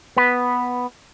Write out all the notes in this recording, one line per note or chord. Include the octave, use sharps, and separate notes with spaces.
B3 B4